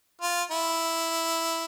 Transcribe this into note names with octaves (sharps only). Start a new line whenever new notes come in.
F4
E4